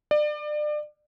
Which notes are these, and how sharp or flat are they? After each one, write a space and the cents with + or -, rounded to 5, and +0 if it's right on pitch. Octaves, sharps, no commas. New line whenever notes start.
D5 +30